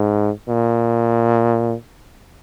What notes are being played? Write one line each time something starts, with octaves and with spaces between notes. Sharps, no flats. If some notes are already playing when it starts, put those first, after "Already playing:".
Already playing: G#2
A#2